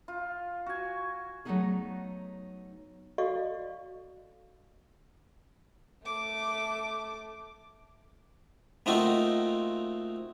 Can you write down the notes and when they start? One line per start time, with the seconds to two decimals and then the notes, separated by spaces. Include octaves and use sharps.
0.08 F4
0.66 F#4 G#5
1.45 F#3 A3 B3 C#4 D#4 G#4
3.18 F#4 A4 D5 D#5 F5 C#6
6.03 A3 D6
8.86 A3 A#3 C4 D#4 F4 F#4